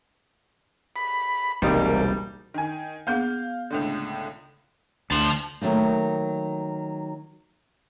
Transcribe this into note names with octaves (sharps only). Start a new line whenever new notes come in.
B5
E1 C2 G3 A#3 D#4
D#3 G#5
A#3 B3 G#4 F5 G6
C#2 A2 D3
D2 A5 C6
D#3 F#3 A3 A#3